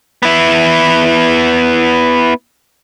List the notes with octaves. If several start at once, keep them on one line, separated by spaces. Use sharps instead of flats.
B3 E4